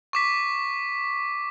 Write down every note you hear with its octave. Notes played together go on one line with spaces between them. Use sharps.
C#6 D6 B6